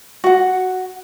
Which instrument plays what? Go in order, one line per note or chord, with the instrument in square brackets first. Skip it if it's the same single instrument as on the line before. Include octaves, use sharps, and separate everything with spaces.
[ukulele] F#4 F#5